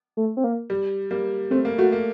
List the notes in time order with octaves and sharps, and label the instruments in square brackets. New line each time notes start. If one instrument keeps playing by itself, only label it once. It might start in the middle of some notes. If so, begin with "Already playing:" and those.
[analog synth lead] A3
C4
A#3
[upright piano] G3
G3 A#3
[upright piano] A3 [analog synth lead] C4
[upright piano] A#3
[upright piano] A3 [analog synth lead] F#4
[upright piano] A#3